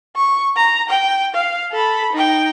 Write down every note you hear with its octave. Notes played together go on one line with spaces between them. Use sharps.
C#6
A#5
G5
F5
A4 B5
D#4 G5